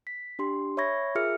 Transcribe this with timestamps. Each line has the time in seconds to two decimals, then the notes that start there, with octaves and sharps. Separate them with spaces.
0.07 B6
0.39 D4 G4 C6
0.77 C#5 E5 B5 C#6 G#6 A#6
1.15 F4 G#4 A#4 E5 F6 C#7